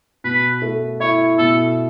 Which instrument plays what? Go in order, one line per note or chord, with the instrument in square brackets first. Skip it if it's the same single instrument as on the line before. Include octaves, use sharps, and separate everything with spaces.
[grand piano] B2 [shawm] B4
[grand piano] A3
[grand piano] E4 [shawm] C#5
[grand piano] B2 [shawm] A4